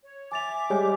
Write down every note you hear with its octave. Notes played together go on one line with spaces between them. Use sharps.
C#5
E5 G#5 D6 A6 F7
G3 G#3 G4 C#5 D5 G#5